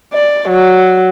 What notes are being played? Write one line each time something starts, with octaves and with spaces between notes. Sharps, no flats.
D5
F#3